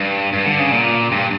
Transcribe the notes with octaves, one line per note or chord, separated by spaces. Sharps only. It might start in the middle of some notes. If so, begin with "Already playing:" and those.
Already playing: G2
G2
D3
C#3
A#2
G2